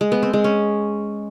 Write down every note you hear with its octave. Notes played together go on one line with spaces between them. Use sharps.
G#3
B3
C4
G#3
C#4